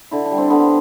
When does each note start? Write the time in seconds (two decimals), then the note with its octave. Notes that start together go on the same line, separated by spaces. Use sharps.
0.11 D3 E4
0.25 D4
0.31 G3
0.38 C4
0.50 D3 B3